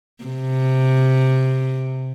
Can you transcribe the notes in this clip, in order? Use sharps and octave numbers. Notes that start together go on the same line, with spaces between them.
C3